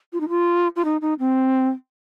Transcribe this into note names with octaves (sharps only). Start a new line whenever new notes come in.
F4
D#4
F4
F4
D#4
D#4
C4